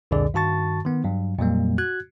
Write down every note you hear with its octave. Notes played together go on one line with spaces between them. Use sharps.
C2 F2 A#2 D3 G#4 D5
G2 D#3 F#4 A5 C#6 A6
D#3 B3
G2 F#3
F2 A#2 F#3 G3 A#3
F#4 F#6 G#6